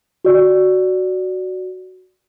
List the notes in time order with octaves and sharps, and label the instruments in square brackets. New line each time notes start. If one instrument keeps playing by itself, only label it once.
[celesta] F#4 D5